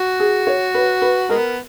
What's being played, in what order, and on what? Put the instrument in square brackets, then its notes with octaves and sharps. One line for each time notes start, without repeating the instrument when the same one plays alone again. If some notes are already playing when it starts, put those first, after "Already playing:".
Already playing: [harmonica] F#4
[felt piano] G#4
C#5
B4
B4
[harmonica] G#3 B3 [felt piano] A#4